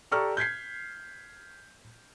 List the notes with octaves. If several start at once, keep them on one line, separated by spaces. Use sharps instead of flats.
G4 A4 D5 A#5 C#6 F6
G6 G#6 B6 C7